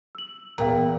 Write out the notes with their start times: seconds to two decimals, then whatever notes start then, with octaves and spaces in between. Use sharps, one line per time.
0.15 E6 F#7
0.58 E2 A#2 F5 G5 A#5